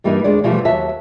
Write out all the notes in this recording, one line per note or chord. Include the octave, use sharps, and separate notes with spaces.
G2 E3 G3 A#3 D4 D#4
D2 G#3 D4 D5
B2 E3 F3 G3 A3 F4
D#2 F#3 E5 A5